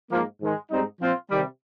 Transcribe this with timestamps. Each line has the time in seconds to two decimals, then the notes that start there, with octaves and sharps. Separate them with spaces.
0.10 G#2 F3 A#3
0.40 G#2 D#3 G#3
0.71 G#2 G3 C4 D#4
1.00 A#2 F3 C4 F4
1.30 C3 D#3 G3